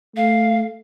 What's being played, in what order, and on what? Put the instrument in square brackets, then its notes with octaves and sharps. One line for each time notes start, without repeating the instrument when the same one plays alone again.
[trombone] A3 [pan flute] F5